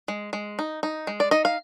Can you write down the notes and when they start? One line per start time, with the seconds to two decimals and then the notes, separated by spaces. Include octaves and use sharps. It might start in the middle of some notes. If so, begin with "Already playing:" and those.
0.08 G#3
0.33 G#3
0.59 D#4
0.83 D#4
1.07 G#3
1.20 D5
1.31 D#4 D#5
1.45 F5